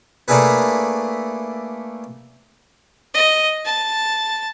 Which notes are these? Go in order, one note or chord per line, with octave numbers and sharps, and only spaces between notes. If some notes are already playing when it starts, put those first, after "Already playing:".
A3 A#3 D4 E4 G#4 B4
D#5
A5